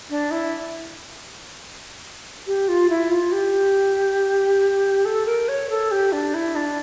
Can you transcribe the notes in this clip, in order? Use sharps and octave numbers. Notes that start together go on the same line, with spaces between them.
D4
E4
G4
F4
E4
F4
G4
A4
A#4
C#5
A4
G4
D4
E4
D4